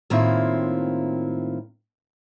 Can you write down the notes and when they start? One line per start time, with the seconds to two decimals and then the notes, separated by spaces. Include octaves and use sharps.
0.10 A2 D#3 A#3 C4 E4 F4